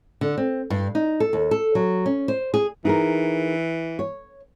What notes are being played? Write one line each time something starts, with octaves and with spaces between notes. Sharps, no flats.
D3
C4
G2
D#4
A4
D#2
A4
F#3
C#4
C5
G#4
E3 D#4 G#4 A#4
C#5